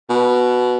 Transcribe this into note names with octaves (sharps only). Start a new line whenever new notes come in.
B2